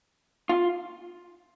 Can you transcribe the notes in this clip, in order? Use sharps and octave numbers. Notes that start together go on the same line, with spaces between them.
F4